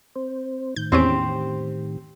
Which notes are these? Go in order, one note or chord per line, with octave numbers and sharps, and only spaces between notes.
C4 C5
A2 D#3 G6
E2 C4 C#4 G4 C5 D7